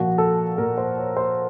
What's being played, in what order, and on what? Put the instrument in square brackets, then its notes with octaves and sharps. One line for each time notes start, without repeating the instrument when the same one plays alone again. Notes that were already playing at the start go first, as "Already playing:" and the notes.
Already playing: [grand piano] A#2 F3 F#4
A4
A#2 F3 A#4
C5
C#5
C5